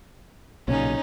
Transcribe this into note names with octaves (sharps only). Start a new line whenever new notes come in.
B1 A#2 C#3 C#4 D#4